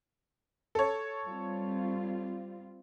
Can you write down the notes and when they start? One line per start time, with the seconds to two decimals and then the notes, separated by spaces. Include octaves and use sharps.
0.75 A4 C#5
1.26 G3 C4 F4